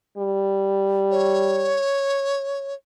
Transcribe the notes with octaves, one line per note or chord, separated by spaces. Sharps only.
G3
C#5